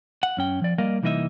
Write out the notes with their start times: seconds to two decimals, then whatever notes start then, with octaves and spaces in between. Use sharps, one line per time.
0.23 F#5
0.37 F#2 C#4 G5
0.62 F3 D5
0.78 G3 A#3 A#4 D5 D#5 F5
1.03 C2 E3 A#3 D#4 D#5 E5